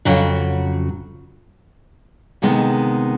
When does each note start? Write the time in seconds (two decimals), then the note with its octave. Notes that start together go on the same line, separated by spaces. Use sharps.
0.05 F2 C#3 F#3
2.42 D2 C3 D#3 G#3 B3